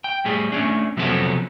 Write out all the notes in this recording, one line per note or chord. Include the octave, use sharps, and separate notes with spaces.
G5
A2 G3 G#4
A3 C#4 D4
C3 F3 F#3 B3 C#4 A4